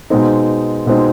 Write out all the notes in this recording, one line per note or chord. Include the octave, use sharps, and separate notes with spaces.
B2 G#3 C4 D#4
B2 G#3 C4 D#4